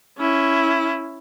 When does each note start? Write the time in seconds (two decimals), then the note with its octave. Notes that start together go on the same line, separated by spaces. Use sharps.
0.19 C#4 E4